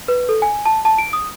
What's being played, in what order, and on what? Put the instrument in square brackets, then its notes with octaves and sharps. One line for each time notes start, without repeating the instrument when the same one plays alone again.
[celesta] B4
A4
G#5
A5
A5
D7
D#6